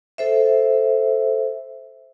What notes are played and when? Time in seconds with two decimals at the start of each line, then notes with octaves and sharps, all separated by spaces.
0.18 A4 C5 E5